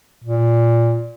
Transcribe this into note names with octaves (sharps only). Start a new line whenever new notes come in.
A#2